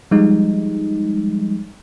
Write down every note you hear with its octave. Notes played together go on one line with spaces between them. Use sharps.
F3 G3 G#3 D#4